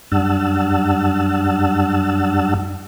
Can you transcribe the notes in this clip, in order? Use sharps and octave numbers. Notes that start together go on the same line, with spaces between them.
F#2 G3 D4 F#5 A5 E6